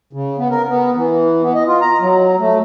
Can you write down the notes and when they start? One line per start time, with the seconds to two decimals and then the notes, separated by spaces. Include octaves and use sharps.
0.13 C#3
0.38 B3
0.51 A#4
0.68 B3
0.95 E3
1.43 B3
1.55 D#5
1.68 F4
1.81 A#5
2.01 F#3
2.39 A3